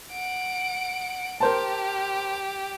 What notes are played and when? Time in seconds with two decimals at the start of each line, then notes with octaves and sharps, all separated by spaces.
0.11 F#5 D7
1.40 G4 A#4 C5 A5